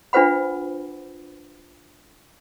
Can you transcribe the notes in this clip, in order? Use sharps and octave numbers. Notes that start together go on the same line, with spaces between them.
D4 F4 B4 C5 F#5 B5